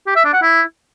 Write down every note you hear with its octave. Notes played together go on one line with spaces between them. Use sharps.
G4
E5
D4
F#5
E4